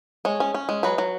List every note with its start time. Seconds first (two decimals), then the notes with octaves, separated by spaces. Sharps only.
0.25 G#3 C#5
0.40 C#4
0.54 C#4
0.69 G#3
0.83 F#3 B4
0.98 F#3